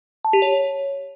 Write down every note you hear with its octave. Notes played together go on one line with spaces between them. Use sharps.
A5
G4
C#5